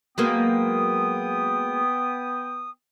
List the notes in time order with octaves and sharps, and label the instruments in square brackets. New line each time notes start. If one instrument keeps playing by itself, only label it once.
[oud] F#3 G#3 A#3 [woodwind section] B3 G5 D#6